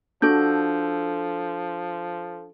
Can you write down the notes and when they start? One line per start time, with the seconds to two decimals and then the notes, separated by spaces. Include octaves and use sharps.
0.22 F3 D4 F#4 A4 G6